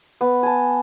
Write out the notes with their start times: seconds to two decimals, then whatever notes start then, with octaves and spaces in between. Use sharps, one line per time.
0.21 B3
0.43 G#5 A5